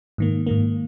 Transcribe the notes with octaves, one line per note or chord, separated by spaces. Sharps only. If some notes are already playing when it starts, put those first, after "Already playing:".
G#2 D#3 A#3
G#2 D#3 A#3